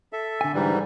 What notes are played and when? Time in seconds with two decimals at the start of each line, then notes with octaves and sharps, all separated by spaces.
0.13 A4 E5
0.41 D3 G#5
0.54 G#2 E3 G3